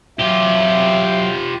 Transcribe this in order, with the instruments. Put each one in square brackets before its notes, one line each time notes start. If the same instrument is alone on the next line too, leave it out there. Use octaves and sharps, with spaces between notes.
[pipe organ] F#3 G5 [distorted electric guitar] F4 G4 [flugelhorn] E5